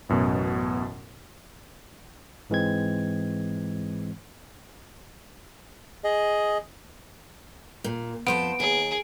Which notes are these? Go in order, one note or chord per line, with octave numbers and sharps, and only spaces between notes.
A1 F#2 B2
G#2 E3 G#3 C4 G#6
G#4 D#5
A#2
F2 B3 C5 A5 D7
D#2 G#4